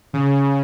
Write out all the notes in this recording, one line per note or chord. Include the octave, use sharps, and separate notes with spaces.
C#3